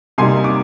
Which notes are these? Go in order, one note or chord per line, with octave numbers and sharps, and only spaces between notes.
C3 G3 A#3 D#4 G#5 C6
D6